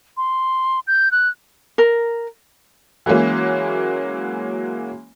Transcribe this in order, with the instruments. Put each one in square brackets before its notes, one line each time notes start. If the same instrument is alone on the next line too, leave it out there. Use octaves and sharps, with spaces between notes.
[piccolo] C6
G6
F#6
[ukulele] A#4
[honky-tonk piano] E3 F#3 G#3 A#3 C#4